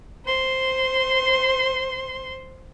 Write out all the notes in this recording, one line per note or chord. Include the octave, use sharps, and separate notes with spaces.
C5 C6